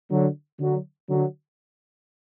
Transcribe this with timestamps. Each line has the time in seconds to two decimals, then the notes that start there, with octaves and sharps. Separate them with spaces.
0.11 D3 F#3
0.60 D3 F#3
1.09 D3 F#3